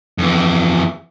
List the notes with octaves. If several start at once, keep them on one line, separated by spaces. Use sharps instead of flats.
F2 E3